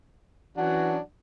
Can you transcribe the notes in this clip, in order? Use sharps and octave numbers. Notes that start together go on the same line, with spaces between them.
E3 F#3 C#4 D4 F#4 F#5